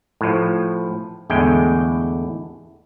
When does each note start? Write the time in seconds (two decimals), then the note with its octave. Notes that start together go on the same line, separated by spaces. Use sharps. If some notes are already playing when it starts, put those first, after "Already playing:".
0.21 A2 F3
1.30 E2 A2 D3 G#3 G5